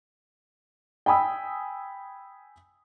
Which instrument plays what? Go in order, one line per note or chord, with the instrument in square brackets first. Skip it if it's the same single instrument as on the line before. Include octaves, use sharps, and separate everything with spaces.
[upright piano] G5 G#5 B5 D#6 E6